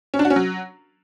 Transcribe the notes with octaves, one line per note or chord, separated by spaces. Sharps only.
C#4
D4
F#4
C#4
F#3